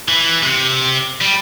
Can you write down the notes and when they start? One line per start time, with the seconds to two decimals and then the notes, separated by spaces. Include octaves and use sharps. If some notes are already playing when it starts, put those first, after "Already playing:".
0.09 E3
0.43 C3
1.21 G3